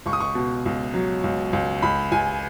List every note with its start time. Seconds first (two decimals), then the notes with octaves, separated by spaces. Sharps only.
0.06 C#2 C#6
0.13 D#6
0.20 C#6
0.35 B2
0.66 C#2
0.94 F#3
1.24 C#2
1.53 C#2
1.82 C#2 B5
2.12 C#2 G#5